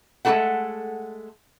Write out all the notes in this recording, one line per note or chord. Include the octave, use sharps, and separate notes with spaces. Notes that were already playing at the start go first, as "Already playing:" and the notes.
G#3 A3 E4 G4 A4 F#5